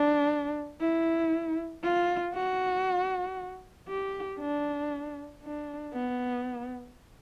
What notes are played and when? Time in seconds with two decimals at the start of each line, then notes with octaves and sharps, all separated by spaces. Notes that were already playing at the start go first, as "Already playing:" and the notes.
Already playing: D4
0.81 E4
1.83 F4
2.34 F#4
3.88 G4
4.39 D4
5.42 D4
5.93 B3